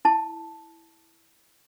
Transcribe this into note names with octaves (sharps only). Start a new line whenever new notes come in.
E4 A5